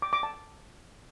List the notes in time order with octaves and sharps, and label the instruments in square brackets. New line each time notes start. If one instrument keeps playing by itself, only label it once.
[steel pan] D6
D6
A5